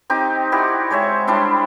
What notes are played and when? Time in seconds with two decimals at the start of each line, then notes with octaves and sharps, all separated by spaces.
0.10 C4 D#4 G4
0.52 E4 F#4 G4 D5
0.90 G#3 C5 C#5 E5
1.27 G3 D4 E4 C6